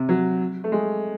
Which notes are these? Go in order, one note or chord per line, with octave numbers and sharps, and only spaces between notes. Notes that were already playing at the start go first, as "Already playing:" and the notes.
Already playing: C3
F#3
A3
G#3